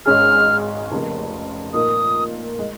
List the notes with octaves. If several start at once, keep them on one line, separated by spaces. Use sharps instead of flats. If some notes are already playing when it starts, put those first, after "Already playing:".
G#1 G#2 G#3 C#4 G#4 F6
F1 F2 C#3 A#3
A#2 A#3 D#4 D#6
G#3